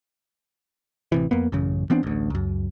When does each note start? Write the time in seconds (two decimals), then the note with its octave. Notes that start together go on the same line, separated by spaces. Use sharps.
1.12 A1 C3 E3
1.31 F2 A#3 B3
1.52 A1 F#2 C#3
1.90 E3 B3 C4 D4
2.03 A1 D2
2.30 C#2 F#2